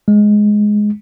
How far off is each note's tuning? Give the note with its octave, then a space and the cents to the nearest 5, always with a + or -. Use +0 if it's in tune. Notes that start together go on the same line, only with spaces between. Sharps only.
G#3 +5